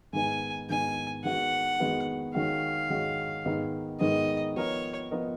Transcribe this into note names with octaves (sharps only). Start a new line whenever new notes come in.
G#2 D#3 G#3 B3 D#4 G#5
G#2 D#3 G#3 B3 D#4 G#5
D#3 G#3 B3 F#4 F#5
D#3 G#3 B3 F#4
D#3 G#3 C#4 F#4 F5
D#3 G#3 C#4 F#4
G#2 D#3 G#3 B3 D#4
G#2 D#3 G#3 B3 D#4 D#5
F3 B3 F4 A#4 C#5 D#5
F3 B3 F4 A#4 D#5